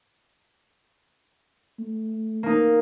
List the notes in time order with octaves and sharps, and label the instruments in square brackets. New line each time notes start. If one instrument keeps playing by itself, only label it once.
[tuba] A3
[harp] A#3 D#4